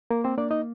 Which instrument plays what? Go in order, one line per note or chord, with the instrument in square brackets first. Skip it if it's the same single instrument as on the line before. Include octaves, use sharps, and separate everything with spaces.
[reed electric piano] A#3 A#4
C4 C5
A#3 D4 D5
D#4 D#5